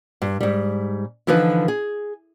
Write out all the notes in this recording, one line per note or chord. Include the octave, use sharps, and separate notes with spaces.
G2
G#2 G3
D3 E3 F3 D#4 B4
G#4